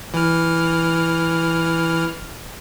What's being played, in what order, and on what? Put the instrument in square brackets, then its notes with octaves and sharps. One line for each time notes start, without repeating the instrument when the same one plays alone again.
[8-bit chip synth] E3 F6